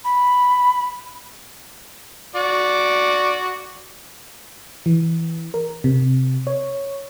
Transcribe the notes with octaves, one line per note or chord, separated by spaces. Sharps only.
B5
F#4 D5
E3
A#4
C3
C#5